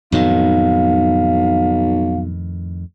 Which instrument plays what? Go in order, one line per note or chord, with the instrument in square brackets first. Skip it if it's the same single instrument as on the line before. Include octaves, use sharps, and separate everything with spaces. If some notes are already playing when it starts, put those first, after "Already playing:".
[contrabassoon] B1 [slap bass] F2 A2 D#3 [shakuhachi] F5